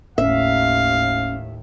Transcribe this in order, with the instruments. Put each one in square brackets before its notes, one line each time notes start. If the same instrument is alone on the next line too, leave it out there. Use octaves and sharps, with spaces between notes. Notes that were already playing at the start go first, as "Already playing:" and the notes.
[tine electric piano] G1 C#4 [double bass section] D#2 A2 [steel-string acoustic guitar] E5 [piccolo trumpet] F5